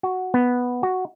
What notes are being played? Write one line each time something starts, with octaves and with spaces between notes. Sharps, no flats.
F#4
B3
F#4